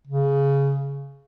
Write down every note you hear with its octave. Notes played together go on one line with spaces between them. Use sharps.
C#3